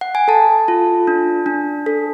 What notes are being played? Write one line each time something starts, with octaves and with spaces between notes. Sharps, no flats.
F#5
G#5
A4 A5
F4
D4
D4
A4